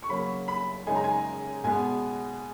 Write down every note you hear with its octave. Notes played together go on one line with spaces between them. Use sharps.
C#6
C#3 F#3 A#3 B5
B5
F#2 C#3 G#3 D#4 G#5
A#5
G#5
B2 G#3 B3 G#5